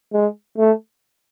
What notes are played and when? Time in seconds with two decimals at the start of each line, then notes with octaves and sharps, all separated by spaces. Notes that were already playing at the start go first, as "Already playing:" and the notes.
0.13 G#3
0.58 A3